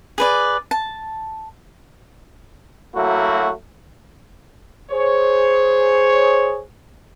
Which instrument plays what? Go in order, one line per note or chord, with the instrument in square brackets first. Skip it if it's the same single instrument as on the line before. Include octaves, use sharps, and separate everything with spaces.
[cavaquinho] G#4 B4 D5
A5
[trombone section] F#3 A3 A#3 E4 F#4
[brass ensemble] G#4 C5 C#5